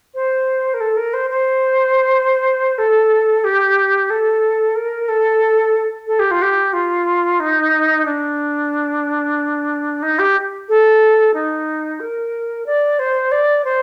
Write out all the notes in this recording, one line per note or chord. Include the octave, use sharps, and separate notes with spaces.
C5
A#4
A4
A#4
C5
C5
A4
G4
A4
A#4
A4
A4
G4
F4
G4
F4
D#4
D4
D#4
G4
A4
D#4
A#4
D5
C5
D5
C5